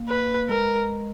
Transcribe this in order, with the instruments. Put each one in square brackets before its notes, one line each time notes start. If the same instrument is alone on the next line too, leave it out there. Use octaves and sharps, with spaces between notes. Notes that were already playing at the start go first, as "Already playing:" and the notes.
Already playing: [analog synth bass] A#3
[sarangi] B4
[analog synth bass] G#3 [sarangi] A#4